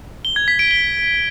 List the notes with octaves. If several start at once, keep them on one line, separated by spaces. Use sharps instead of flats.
G7
G#6
B6
D7
G7